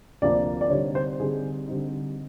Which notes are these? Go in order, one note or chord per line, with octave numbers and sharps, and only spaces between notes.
D2 C3 F3 A#3 D4 D5
D5
D3 G3 C4 D#4 C#5
C5
D3 G3 C4 D#4 G#4
D3 G3 C4 D#4